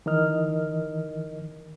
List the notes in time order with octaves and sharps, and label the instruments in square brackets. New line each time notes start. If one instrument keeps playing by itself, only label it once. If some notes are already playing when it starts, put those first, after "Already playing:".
[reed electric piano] D#3 E3 A#4 D#5 F6